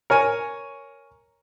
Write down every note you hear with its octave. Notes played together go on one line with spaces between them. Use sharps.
A#4 C#5 G#5